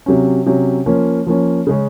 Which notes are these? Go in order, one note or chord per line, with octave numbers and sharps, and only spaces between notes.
C3 F#3 C#4
C3 F#3 C#4
F3 A#3 C#4
F3 A#3 C#4
C#3 G#3 C#4